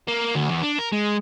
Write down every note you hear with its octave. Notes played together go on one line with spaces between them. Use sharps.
A#3
D2
E2
D4
A#4
G#3